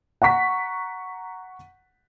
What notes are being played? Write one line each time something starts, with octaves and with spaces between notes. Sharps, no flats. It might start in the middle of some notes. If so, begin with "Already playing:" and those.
F#5 A#5 C#6 B6